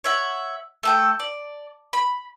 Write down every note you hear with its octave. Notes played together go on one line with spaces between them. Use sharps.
C#5 E5 F#5
A3 A4 G5
D5
B5